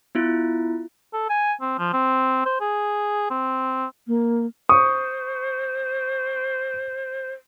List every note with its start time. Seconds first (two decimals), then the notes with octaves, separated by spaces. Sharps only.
0.15 B3 E4 F4
1.13 A4
1.29 G#5
1.61 C4
1.79 F3
1.93 C4
2.45 C5
2.61 G#4
3.30 C4
4.07 A#3
4.69 C5 C#6 D#6